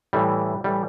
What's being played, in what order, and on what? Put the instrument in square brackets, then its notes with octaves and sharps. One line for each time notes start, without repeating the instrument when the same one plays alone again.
[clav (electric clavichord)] A2 E3 G3
A2 E3 G3